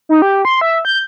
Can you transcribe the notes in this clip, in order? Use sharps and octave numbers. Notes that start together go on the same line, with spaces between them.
D#4
G4
C6
E5
G6